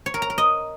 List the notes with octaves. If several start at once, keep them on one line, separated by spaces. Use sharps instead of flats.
C#5
A#4
A#5
A#4
D#5